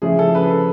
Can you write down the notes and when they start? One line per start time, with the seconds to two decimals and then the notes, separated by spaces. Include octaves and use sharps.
0.02 C#3 F3 A3 C#4 E4 G#4
0.19 A4
0.35 B4
0.51 A4